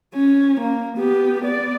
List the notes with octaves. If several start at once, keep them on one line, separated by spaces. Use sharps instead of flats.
C#4
A#3
B3 G4
B3 D5